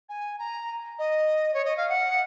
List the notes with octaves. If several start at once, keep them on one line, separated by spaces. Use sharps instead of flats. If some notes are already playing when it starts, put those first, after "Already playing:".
G#5
A#5
D#5
C#5
D#5
F5
F#5